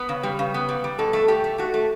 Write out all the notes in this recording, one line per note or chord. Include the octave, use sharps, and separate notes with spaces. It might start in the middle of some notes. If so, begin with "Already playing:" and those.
Already playing: B3 B4
C#3
G3
C#3
B3
G3
G3
B2 A4
A3
A3 G4
A3
A3 F#4
A3